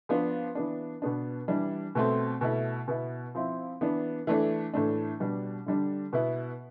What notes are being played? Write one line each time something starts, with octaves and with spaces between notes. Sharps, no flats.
F3 B3 D4
E3 B3 D4
B2 B3 D4
E3 G3 D4
B2 A3 C4
B2 A3 E4
B2 B3 E4
F3 C4 E4
E3 B3 D4
E3 A3 D4
A2 E3 A3 D4
B2 G3 D4
D3 G3 D4
B2 B3 E4